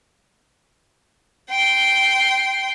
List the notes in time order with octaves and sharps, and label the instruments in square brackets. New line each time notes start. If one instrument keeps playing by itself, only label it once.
[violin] G5 C6